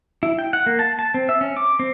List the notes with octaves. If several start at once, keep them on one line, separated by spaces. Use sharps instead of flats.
E4
G5
F#5
A#3
A5
A5
C4
E5
C#4
D6
C4